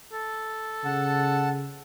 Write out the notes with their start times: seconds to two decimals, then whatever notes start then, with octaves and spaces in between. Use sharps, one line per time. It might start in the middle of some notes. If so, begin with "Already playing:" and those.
0.12 A4
0.85 C#3 F#5 A5